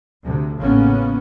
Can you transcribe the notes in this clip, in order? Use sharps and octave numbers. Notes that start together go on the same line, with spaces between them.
D2 C3
A1 A2 C#3 A#3 B3 C#4